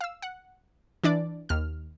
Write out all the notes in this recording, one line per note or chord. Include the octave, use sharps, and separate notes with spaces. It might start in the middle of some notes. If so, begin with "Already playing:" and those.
F5 E6
F#5
E3 D4 D5
D#2 F6